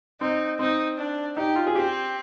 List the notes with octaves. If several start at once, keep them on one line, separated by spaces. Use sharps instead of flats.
C4 D#4
C4 D#4
D4
D#4 G4
F4
G#4
C4 G4